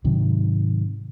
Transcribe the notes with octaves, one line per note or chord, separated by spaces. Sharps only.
G#2 C3 D#3 F#3